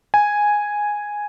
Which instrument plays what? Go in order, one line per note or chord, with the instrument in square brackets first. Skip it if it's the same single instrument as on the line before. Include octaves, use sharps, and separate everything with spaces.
[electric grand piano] G#5